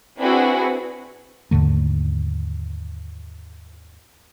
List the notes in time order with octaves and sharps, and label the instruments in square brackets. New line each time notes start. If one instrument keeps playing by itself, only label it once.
[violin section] C4 D4 E4 F#4 G#4 B4
[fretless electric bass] D#2 G#2 D3 A3